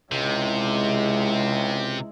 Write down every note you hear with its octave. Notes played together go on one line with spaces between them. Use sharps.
C#2 C3 G#3 E4